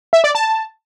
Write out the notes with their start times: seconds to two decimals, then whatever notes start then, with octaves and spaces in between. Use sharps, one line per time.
0.13 E5
0.24 D5
0.35 A5